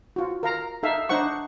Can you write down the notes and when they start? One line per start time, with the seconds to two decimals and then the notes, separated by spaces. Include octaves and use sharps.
0.16 F4 F#4
0.43 A#4 F5 A#5
0.83 D#4 A4 E5 F5
1.09 D4 D#4 C5 F#5 C#6